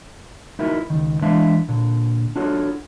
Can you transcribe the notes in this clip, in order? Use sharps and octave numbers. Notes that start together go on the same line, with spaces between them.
D#4 E4 F#4 A#4 E5
C#2 D#3
E3 G#3 D4 E5 F5
A#2 D3
D4 F4 F#4 A4 C#5